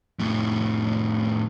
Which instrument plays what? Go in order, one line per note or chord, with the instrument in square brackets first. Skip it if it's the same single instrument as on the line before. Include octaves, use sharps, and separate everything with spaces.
[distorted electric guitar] F2 A2